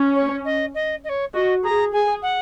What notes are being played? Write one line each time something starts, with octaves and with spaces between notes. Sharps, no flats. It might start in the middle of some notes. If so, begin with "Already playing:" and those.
Already playing: C#4
C#5
D#5
D#5
D#5
C#5
F#4 D#5
G#4 A#5
G#4 G#5
F#5